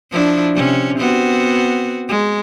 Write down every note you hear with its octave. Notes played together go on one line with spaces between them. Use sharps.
F3 D4 E4
C3 C#4
B3 C4 F#4
G#3